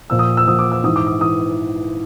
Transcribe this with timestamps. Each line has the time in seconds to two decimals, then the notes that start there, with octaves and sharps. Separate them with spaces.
0.10 A#2 F3 E6
0.19 D#6
0.37 E6
0.47 A#2 F3 D#6
0.59 D6
0.72 E6
0.83 G#2 E3 D#6
0.96 D6
1.07 D#6
1.21 E3 D#6